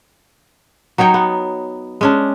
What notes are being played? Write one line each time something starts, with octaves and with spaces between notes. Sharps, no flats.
F#3 D#4 C#5 G5
B3
G#3 C#4 D4